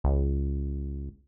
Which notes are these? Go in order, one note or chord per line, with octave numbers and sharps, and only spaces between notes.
C#2